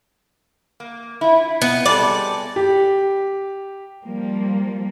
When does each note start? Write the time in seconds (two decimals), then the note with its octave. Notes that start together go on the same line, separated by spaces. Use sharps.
0.80 A#3
1.21 E4 F4
1.62 B3
1.86 G3 G#3 A4 D5
2.56 G4
4.06 F3 G3 A#3